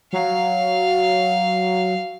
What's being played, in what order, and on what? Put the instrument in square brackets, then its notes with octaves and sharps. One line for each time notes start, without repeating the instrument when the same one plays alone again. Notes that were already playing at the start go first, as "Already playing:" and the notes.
[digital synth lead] F#3 [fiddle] F5